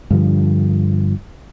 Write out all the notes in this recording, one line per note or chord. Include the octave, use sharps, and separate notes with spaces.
G2 D3 F3